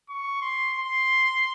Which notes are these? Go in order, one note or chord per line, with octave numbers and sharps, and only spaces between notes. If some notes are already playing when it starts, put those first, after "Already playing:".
C#6
C6
C6